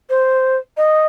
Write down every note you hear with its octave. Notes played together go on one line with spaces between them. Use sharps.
C5
D#5